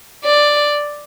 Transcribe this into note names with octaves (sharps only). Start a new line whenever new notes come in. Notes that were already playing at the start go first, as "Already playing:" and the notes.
D5